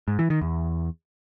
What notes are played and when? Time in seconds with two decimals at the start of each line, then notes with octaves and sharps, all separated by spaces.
0.08 G#2
0.19 E3
0.30 D#3
0.41 E2